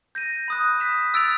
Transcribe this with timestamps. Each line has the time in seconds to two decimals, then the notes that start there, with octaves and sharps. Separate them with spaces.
0.15 G6 A#6 D#7
0.48 B5 D#6 F#6
0.80 F#6 B6 E7
1.14 E6 A6 D7 F7